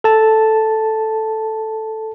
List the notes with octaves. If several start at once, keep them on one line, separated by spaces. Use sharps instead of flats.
A4 A5